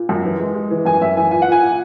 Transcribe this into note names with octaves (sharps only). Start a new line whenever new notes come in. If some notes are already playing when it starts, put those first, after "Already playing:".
Already playing: A#2
F#2
E3
G#3
G#3
E3
F#2 G#5
F#2 E5
E3 G#5
A#2 G#5
F#5
A#2 G#5
A#2